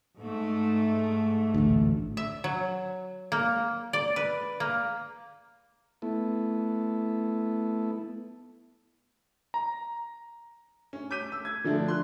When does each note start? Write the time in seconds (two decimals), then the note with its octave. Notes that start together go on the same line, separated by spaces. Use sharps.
0.18 G#2 A3
1.54 A1 D2
2.17 E5
2.44 F#3
3.32 A#3
3.93 D5
4.16 B4
4.60 A#3
6.02 A3 B3 E4
9.54 A#5
10.93 C#4
11.11 D6 G6 B6 D#7
11.32 E6
11.45 G#6
11.64 D3 F3 A3 D4
11.88 C6 F#6